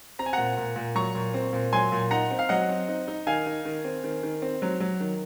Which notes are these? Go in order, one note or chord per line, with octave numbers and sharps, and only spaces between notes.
C4 A#5
G#5
A#2 F#5 A#5
A#2
A#2
F#3 A#5 C#6
A#2
C4
A#2
F#3 G#5 C6
A#2
D#4 F#5 A#5
C4
F5
F#3 D#5 F#5
C4
D#4
D#4
D#3 F5 G#5
D#4
D#3
C4
D#3
D#3
C4
F#3
F#3
D#3